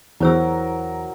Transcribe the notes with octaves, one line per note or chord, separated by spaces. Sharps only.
E2 F#3 E4 A#4 C5 E6